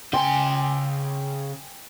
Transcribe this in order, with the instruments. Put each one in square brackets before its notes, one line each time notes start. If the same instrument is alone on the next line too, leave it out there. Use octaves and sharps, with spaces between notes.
[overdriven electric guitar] C#3 C6 [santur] G5 G#5